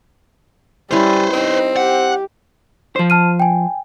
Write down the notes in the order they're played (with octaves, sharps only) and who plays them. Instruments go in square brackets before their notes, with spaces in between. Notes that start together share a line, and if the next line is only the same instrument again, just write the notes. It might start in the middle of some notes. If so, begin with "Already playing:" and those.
[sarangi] G3 [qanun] C#4 E4 [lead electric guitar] B4 C5
[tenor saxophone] C4 [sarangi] D#4
[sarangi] G4 [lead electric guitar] F#5
[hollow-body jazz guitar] F3 C5
[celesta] A5 F6 D#7
G5 G#5